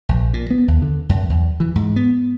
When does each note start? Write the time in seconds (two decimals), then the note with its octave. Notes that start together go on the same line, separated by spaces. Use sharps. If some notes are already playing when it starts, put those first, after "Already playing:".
0.09 A#1
0.33 A#2
0.51 B3
0.68 D#2
0.82 D3
1.09 F#2
1.30 E2
1.60 E3
1.76 G#2
1.96 B3